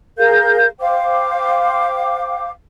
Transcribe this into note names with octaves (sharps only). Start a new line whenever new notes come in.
G#4 A#4 F5 G6
C5 F5 G5 D6